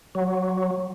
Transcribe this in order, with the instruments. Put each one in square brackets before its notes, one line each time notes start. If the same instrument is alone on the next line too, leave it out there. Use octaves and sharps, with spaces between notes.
[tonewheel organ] F#3